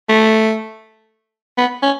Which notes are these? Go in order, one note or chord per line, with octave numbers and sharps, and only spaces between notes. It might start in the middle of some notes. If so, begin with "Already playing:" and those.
A3
B3
C#4